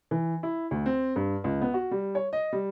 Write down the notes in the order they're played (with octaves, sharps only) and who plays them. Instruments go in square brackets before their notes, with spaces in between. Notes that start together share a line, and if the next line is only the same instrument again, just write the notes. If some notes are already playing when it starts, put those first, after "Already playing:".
[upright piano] E3
E4
D2
C4
G2
C#2
B3
F#4
G3
C#5
D#5
G3